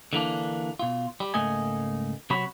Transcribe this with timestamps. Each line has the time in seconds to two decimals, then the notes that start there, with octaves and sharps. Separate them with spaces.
0.13 D3 E3 A#3 D4
0.79 B2 F4
1.20 G3
1.34 C#2 G#2 A3 A#3 D#5 G#5
2.30 C3 F#3 F#4 C#5 B5